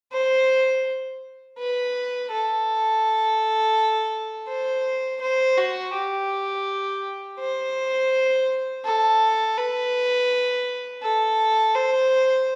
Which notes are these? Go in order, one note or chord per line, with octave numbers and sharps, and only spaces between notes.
C5
B4
A4
C5
C5
F#4
G4
C5
A4
B4
A4
C5